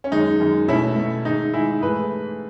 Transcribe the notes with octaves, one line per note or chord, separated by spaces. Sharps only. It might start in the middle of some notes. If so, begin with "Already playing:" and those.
C#4
F#2 D#3 G#3 D#4
F#2 D#3 G#3
B2 A3 C#4 E4
B2 A3
G#2 D#3 G#3 D#4
G#2 D#3 G#3 E4 G#4
G#2 E3 A3 G#4 B4